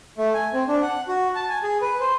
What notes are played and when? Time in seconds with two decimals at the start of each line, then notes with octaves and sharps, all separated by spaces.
0.18 A3
0.34 G#5
0.53 C4
0.68 D4
0.82 F#5
1.08 F#4
1.35 A5
1.49 G#5
1.63 G#4
1.82 B4
2.00 C5